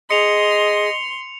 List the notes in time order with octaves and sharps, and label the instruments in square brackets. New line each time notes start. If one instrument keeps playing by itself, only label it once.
[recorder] G#4 [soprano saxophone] D#5 [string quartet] C6 [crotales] C#7 F7